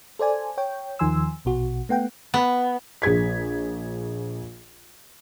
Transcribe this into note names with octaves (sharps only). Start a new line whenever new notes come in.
A4 C5 D5 G#5
C#5 G5
D#2 D#3 F3 G#5 C6 E6
A#1 B2 F#4
A3 B3 F#5 G5
B3
A#1 G#4 G#6 B6